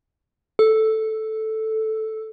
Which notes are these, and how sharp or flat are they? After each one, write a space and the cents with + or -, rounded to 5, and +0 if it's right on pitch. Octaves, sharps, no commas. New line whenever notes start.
A4 -5